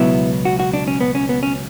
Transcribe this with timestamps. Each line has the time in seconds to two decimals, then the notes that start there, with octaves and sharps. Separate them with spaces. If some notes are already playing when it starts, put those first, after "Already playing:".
Already playing: C#2 B2 F#3 B3 E4
0.45 F#4
0.60 F#4
0.74 D4
0.88 C#4
1.01 B3
1.15 C#4
1.29 B3
1.43 C#4